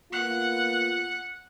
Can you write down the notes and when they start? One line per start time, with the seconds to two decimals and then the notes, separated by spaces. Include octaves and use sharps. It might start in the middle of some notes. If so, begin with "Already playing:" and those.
0.12 A#3 B3 F4 F#5